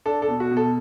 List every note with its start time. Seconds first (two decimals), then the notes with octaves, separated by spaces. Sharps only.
0.06 D4 A4
0.22 A4
0.28 B2
0.40 F#4
0.51 B2
0.57 A4